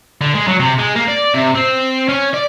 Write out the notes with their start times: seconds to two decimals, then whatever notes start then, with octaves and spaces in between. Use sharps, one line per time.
0.21 D3
0.35 G#3
0.48 F#3
0.60 C3
0.78 G#3
0.96 A#3
1.08 D5
1.34 C3
1.55 C4
2.09 C#4
2.33 D5